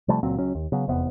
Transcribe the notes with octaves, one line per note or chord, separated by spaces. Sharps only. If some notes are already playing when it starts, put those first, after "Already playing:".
C3 F3 G3 A3
C#2 A#2 F#3 C4
C#2 F#3 C#4
D#2
C#3 F#3 B3
F1 E2 C3 B3